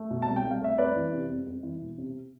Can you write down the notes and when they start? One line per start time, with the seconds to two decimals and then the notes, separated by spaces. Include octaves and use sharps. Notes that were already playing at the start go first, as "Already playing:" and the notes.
Already playing: A3
0.10 B2
0.22 A5
0.28 C2
0.36 G5
0.44 C2
0.51 F5
0.62 A3 E5
0.78 F2 B4 D5
0.96 E3
1.12 C3
1.30 F2
1.46 F2
1.63 E3
1.81 E1
1.98 C3